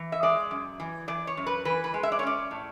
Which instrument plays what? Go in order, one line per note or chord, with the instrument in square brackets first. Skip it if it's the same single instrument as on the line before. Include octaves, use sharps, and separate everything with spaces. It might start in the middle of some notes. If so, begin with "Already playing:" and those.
Already playing: [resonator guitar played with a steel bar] E3
E5
G#3 D5
F#2
E3
E3 D5
C#5
F#2
B4
E3 B4
B4
G#3
E5
D5
C#5
C#4 D5
A2